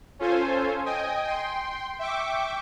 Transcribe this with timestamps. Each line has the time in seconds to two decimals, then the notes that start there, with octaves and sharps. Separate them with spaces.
0.19 C#4 F4 A4 C5 G#5
0.86 D#5 G5 G#5 D#6
1.24 G5 C6
1.99 E5 G5 C#6 D6